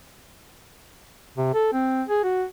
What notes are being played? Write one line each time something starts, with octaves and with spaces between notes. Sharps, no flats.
C3
A4
C4
G#4
F#4